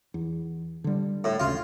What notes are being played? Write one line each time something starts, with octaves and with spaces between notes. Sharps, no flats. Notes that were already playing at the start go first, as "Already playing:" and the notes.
E2
D3 G3
A2
E1 D2 C#3 F4